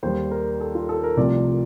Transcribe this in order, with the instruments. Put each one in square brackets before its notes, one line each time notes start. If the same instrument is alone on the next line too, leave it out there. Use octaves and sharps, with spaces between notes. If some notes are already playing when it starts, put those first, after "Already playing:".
[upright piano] D#2 D#3 G3 C5
A#4
A4
F4
A4
A#4
C2 C3 F3 A3 D5